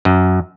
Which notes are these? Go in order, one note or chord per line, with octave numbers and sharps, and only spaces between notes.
F#2